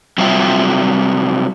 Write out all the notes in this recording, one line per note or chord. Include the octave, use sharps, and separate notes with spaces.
C3 F#3 G3 F4 E5 G5